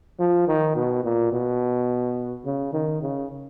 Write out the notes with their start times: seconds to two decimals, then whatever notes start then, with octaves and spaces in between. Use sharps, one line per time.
0.19 F3
0.48 D#3
0.76 B2
1.04 A#2
1.33 B2
2.45 C#3
2.73 D#3
3.02 C#3